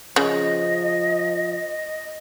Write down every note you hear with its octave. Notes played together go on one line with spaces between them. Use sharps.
C#3 F3 D#5